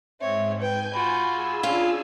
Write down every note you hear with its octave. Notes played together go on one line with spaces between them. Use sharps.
G#2 C4 C#5 E5
B4 G5 G#5 G6
F4 F#4 B5
G#4 G#5 E6
C#4 D4 F4